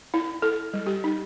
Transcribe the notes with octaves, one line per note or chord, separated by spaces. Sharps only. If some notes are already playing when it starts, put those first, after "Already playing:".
E4
A4
G3
G4
D#4